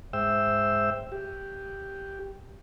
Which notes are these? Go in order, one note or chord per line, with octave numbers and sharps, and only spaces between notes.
G#2 C5 E5 G5 E6
G4